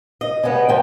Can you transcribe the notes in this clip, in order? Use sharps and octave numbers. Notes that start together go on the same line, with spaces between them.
D#5
C#3 G3 G#3 B3
G#2 F3 G5